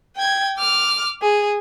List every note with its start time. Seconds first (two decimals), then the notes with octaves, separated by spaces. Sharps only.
0.16 G5 G#6
0.57 D6 F6
1.22 G#4